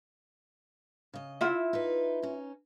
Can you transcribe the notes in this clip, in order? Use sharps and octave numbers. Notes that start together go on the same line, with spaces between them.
C#3 D#5
E4 F4 E5
D#4 B4
C#4 D#4